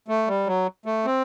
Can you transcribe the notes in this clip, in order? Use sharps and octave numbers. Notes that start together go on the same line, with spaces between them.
A3
G3
F#3
A3
C4